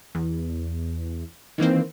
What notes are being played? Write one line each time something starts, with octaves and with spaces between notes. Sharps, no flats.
E2
D#3 E3 A#3 C4